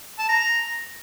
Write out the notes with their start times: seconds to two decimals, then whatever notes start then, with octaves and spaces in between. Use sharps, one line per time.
0.18 A5
0.28 A#5